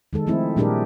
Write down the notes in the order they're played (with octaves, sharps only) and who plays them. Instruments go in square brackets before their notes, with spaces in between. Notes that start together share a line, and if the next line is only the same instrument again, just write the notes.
[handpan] D#3 G#3 A4
F3 A3 C4 E4
A#2 G3 D4 G4 G#4 A#4